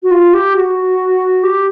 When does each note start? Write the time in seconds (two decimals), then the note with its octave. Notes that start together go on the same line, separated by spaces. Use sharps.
0.03 F#4
0.11 F4
0.33 G4
0.56 F#4
1.43 G4